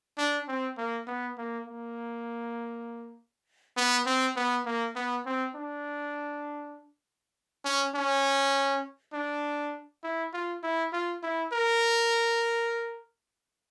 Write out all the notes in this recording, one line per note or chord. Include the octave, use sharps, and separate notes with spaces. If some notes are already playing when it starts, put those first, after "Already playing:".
D4
C4
A#3
B3
A#3
A#3
B3
C4
B3
A#3
B3
C4
D4
C#4
C#4
D4
E4
F4
E4
F4
E4
A#4